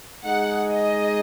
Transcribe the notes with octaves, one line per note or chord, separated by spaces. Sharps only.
G#3 D#4 G#4 F#5
D#5